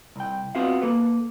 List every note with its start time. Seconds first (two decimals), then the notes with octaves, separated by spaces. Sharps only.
0.16 C2 G5
0.55 B3 C4 F4 F#4 E5 F5
0.82 A#3 A4 B4